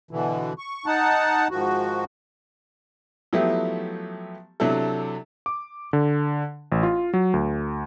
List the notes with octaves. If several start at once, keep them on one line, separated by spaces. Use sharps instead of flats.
B2 D3 E3
C#6
D#4 F#5 A5
G#2 D#3 F3 F#4
F3 F#3 A3 B3 E4 G4
C3 F#3 D4 E4 A4
D6
D3
A1
F4
F#3
D2